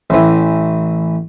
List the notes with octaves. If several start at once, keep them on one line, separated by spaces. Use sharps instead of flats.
A1 E3